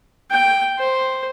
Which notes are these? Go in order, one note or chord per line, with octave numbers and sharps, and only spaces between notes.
G5
C5